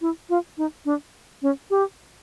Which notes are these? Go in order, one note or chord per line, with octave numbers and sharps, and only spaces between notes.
E4
F4
D#4
D4
C#4
G4